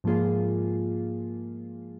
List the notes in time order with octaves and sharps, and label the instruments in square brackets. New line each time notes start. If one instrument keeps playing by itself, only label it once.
[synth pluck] G#2 F3 A#3 F4 G#4